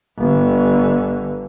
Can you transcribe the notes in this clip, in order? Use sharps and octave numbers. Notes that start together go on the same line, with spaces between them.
G1 D3